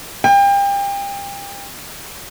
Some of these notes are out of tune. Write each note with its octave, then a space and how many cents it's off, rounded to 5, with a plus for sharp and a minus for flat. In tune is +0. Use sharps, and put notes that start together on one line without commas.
G5 +30